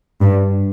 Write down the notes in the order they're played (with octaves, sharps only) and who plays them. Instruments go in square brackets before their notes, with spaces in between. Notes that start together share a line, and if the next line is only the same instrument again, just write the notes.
[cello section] G2